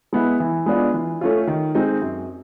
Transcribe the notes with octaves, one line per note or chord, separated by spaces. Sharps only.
G#3 B3 E4
E3
G#3 B3 D4 F4
E3
A3 C#4 F4
D#3
G#3 C4 D#4
F#2